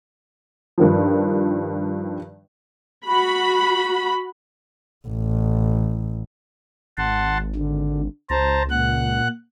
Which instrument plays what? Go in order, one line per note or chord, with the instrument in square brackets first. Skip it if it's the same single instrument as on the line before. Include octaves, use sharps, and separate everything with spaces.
[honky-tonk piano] G2 D#3 F3
[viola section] F#4 B5
[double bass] A1
[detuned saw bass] G#1 [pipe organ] F#5 A5 C6
[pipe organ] D3
[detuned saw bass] C#2 [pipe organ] C5 A5 A#5
[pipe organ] A#2 F#5 F#6